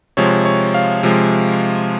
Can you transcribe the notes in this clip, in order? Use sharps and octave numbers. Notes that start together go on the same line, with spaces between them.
C3 F3 G#3 C#5
C#5
F5
C3 F3 G#3